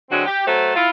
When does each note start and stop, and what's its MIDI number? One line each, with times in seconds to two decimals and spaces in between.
0.09 0.25 50
0.09 0.25 54
0.09 0.25 56
0.09 0.25 60
0.09 0.25 66
0.26 0.42 67
0.46 0.74 54
0.46 0.74 57
0.46 0.74 69
0.46 0.74 71
0.46 0.74 72
0.75 0.89 64
0.75 0.89 65